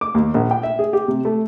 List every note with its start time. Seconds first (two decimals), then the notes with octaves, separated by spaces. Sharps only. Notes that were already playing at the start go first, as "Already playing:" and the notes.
0.01 D6
0.14 D#2
0.34 A#1
0.51 G5
0.63 E5
0.79 G#4
0.93 G4
1.08 C3
1.25 A3